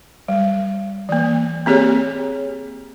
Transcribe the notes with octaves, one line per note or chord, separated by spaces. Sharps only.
G3
E3 A#3
A#3 C4 G4 G#4 C#5